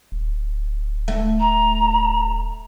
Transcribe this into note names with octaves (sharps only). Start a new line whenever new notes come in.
D1
A3
A#5